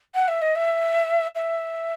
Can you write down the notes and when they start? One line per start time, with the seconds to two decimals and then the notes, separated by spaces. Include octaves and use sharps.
0.15 F#5
0.28 E5
0.42 D#5
0.56 E5
1.35 E5